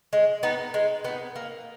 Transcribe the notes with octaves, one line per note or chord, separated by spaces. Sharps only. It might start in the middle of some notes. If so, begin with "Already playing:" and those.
G#3
B3 D#4
G#3
B3 D#4
A#3